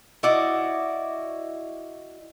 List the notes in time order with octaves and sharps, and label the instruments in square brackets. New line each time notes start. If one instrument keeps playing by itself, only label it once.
[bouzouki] E4 F#4 D5 D#5